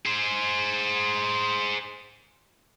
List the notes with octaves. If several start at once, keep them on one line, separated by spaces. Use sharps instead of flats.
G#4 C5